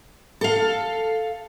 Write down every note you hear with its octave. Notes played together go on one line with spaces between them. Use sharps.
A4 F5